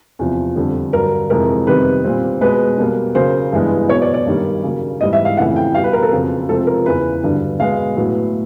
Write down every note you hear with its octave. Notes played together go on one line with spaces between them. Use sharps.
E2 C3 F3
F2 D3 G3
G2 D3 F#3 A#4
F2 C3 E3 G#3 A#4
F2 C3 D#3 G3 B3 B4
A#2 G3 C4
B2 G#3 B3 B4
B2 G3 A#3
C#3 F#3 A#3 C5
G2 E3 G#3 B3
B2 F#3 B3 C#5
D5
D5
G2 D#3 G3 A#3
C#3 F#3 A#3
G#2 E3 G3 B3 D#5
E5
F5
F2 C#3 E3 A3 F#5
G5
B2 G3 B3 F5
B4
A#4
A4
F2 C#3 F#3 B3
C3 F3 G#3 C4 A4
A#4
E2 C#3 E3 B4
G2 D3 F#3 B3
B2 G#3 B3 F5
A2 F#3 B3